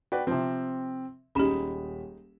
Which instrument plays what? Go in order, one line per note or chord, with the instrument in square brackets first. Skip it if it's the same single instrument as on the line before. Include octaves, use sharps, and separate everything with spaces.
[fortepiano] F#4 B4 D5 [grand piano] G5
[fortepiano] C3 F3 [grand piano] C4
[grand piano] D#1 B5 E7 [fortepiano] G#3 D#4 [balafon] C#4 G4